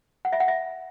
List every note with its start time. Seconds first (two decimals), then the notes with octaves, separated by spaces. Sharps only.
0.25 F#5
0.33 E5
0.40 F#5
0.48 E5